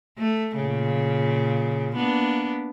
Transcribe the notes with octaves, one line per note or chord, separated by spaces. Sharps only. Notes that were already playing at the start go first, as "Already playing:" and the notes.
A3
A#2 C#3
A#3 B3 D4